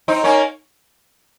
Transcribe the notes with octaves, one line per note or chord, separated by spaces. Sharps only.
C4 D#4
A#3 C#4